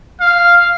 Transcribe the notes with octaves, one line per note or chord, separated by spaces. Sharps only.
F5